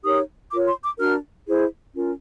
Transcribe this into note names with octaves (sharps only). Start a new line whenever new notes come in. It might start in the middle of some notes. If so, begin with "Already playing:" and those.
D#4 G4 A#4 C#5 D#6
F4 A#4 C#5 D6
C6
D6
D4 F#4 A#4 F6
E4 G#4 C5
C#4 F4 A#4